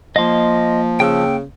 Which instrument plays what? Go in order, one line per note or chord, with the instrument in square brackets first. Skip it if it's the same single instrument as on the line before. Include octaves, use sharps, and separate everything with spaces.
[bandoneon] F3 [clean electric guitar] A#3 F5 [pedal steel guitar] D#5 C6
[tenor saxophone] C#3 [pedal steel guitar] G5 E6